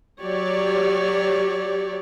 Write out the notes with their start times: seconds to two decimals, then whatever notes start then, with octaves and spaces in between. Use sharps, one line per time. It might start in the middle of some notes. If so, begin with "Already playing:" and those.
0.21 F#3 G4 C#5 D5